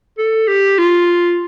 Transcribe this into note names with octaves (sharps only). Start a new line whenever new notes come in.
A4
G4
F4